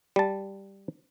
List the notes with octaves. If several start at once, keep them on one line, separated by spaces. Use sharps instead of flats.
G3 A5